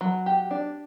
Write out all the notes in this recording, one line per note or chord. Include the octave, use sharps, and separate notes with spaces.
F#3
G4
D4